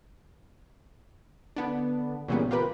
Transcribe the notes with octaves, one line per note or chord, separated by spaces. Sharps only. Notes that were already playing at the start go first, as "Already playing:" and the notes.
D3 B3 D4
A#2 C#3 E3 G3 B3 C#4
F4 G4 A#4 B4